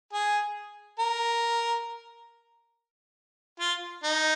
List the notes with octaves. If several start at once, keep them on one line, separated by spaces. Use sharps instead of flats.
G#4
A#4
F4
D#4